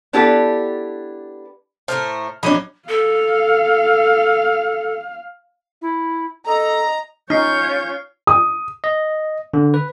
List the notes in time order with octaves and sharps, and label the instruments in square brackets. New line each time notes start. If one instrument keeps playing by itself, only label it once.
[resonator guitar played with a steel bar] B3 D4 E4 G4 A4 B4
[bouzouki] A2 A3 A#4 [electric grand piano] C5 A5 F6
[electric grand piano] A#1 F#3 D#7 [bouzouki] C#4 D#5 [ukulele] D4 C#5 B5
[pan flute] A4 [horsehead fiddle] F5
[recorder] E4
[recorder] A4 [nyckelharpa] D#5 [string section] A#5
[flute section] C#4 F4 G6 [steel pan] D#4 [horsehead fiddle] C#5 [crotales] F6 C7
[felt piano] D#6
[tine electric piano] D#5
D3
B4